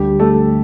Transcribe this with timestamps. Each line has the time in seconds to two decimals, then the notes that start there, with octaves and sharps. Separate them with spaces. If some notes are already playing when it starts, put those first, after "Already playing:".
Already playing: D2 D3 G3 G4
0.19 A3 A4